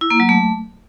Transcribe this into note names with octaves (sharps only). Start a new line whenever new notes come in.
E4
A#3
F#3
A3